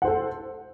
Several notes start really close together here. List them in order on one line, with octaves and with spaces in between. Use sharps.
F#5 C5 A4